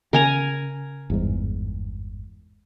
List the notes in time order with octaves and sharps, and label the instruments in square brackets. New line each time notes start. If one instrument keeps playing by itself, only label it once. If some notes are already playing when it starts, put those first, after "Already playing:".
[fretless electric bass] C#3 [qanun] A#4 G#5 A#5
[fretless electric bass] G1 E2 G#2